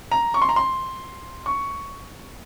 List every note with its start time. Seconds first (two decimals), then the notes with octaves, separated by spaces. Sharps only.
0.12 A#5
0.34 C#6
0.42 C6
0.49 A#5
0.56 C6
1.46 C#6